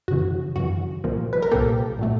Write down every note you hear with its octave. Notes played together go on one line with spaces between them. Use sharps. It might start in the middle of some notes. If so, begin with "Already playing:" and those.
F#2 C#3 E3 F#4
F#2 C#3 E3 F#4
C2 A#2 F3 A#3
B4
A#4
C2 A#2 F3 A#3 G4 A4
A#2 F#3 A3